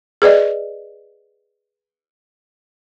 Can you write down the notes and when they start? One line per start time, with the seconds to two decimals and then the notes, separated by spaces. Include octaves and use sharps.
0.22 G#4 B4 D5 D#5